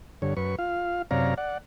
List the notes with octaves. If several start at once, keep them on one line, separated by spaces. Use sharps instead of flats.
G2 D3 C#5
F#2 B4 C#6
F4 F5
F#2 C3 C#5 D5 F5 A#5
D5 F#5